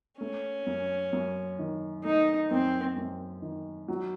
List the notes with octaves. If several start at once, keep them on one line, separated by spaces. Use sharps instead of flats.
A3 C#4
F#2
F#2
D#3
A3 D#4
F#2 C4
F#2
D#3
F#3